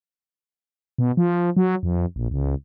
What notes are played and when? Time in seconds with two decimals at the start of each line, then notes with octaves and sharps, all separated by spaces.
0.98 B2
1.17 F3
1.57 F#3
1.83 F2
2.16 A#1
2.31 C#2